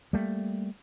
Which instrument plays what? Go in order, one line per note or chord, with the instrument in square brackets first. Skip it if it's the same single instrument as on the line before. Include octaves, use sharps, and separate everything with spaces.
[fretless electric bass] G3 A3 A#3